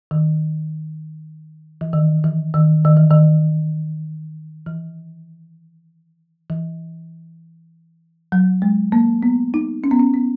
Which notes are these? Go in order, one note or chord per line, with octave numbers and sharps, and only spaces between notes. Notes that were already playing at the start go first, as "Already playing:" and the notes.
D#3
E3
D#3
E3
D#3
D#3
E3
D#3
E3
E3
F#3
G#3
A#3
B3
D#4
C#4
B3
C#4
B3